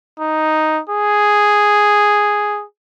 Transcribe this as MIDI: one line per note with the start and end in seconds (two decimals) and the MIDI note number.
0.20 0.81 63
0.89 2.64 68